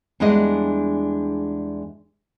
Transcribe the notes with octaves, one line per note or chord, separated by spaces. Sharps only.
E2 G3 G#3 D4 G#4 D#5